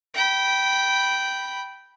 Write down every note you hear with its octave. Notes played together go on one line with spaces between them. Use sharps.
G5 B5